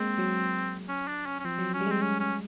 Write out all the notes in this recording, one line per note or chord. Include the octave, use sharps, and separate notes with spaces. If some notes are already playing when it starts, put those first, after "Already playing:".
Already playing: G#3 A#3 C4
F#3
C#4
D4
C#4
C#4
F3 C4
F#3
C#4
G3
G#3 C4
C#4
C#4